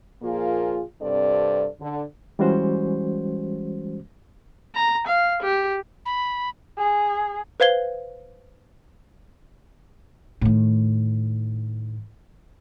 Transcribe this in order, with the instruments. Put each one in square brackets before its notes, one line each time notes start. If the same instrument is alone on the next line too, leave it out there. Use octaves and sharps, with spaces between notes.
[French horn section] A#2 F3 A#3 F4 G#4
G2 C3 C4 A4 D5
D3
[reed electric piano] E3 G3 G#3 C#4 F#4 C5
[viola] A#5
F5
G4
[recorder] B5
[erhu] G#4
[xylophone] B4 C5 F5 G#6 G7
[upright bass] A2 D#3